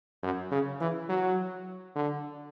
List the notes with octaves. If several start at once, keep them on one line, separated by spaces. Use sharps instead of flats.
F#2
C#3
E3
F#3
D3